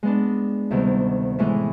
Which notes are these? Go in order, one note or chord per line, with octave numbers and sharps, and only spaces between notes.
G#3 B3 D4
D2 C3 D#3 G3 B3
A2 E3 G#3